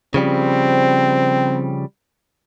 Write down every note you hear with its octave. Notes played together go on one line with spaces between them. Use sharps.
C#3 F3 G3 C4